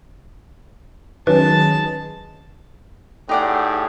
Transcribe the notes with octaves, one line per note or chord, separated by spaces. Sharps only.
D#3 F#3 G#3 C#4 B4 A5
A2 D#4 G4 G#4 D5 F#5 G5